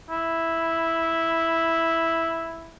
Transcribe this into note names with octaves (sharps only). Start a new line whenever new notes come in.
E4